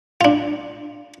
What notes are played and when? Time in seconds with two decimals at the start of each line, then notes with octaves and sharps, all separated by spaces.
0.21 D4 F4